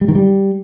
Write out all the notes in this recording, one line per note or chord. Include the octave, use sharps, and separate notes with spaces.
G3
D#3
G3